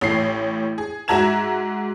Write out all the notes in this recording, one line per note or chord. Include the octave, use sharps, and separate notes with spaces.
A1 A2 C7
G#4
G#2 F#4 E5 A#5 G#6 E7